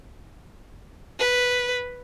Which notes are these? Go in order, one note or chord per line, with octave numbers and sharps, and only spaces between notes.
B4